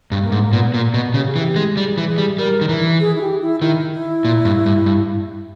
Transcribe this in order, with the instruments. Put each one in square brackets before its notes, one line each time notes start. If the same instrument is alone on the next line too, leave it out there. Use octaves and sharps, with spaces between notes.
[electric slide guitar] G2
[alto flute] A#3
[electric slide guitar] G#2
[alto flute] A#3
[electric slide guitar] A#2 [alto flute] B3
[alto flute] B3
[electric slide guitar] A#2 [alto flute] A#3
[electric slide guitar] B2 [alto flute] B3
[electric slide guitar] C#3 [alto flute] G4
[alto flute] G#4
[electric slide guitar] E3
[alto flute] G4
[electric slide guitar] G#3
[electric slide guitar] G3 [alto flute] G#4
[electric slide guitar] E3
[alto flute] G#4
[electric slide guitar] G3
[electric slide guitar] G3 [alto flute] A#4
[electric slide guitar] D#3
E3
[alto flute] G#4
E4
G4
E4
[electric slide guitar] D#3 [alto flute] E4
[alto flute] E4
[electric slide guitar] A#2
G2
G2
G2